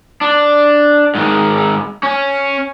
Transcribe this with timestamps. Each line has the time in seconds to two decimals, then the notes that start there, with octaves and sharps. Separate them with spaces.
0.21 D4
1.15 G#2 D#3
2.03 C#4